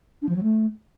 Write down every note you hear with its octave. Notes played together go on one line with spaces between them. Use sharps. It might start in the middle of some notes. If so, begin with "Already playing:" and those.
D4
F3
F#3
A3